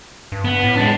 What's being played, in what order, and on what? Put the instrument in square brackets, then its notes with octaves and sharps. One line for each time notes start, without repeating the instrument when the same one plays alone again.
[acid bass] G2
[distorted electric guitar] B3
[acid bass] A2
[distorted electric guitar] G#3 D4